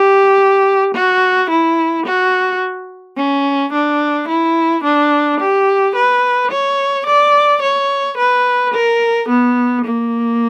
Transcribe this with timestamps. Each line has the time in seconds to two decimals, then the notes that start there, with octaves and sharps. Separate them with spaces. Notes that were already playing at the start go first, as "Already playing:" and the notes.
Already playing: G4
0.95 F#4
1.50 E4
2.06 F#4
3.17 C#4
3.73 D4
4.29 E4
4.84 D4
5.40 G4
5.95 B4
6.51 C#5
7.06 D5
7.62 C#5
8.18 B4
8.74 A#4
9.29 B3
9.85 A#3